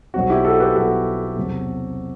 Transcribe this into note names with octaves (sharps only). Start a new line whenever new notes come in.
B1 B2 F#3 C4 F#4
E4 G4
F#4 A4
G4 B4
B1 B2 F#3 C4 F#4 A4
E2 C3 F#3